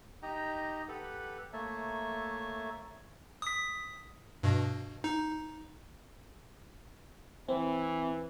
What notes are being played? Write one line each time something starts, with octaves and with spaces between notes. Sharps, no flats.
D#4 G4 D#5 G5 A#5
G4 A4 B4 F#5
A3 A#3 C#5 E5 A5
D#6 B6
G2 B2
D#4
E3 C4